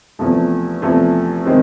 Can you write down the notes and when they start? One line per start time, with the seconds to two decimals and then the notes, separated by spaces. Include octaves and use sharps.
0.19 E2 C3 F3 A3
0.82 E2 C3 F3 A3
1.46 C3 D#3 G#3 C4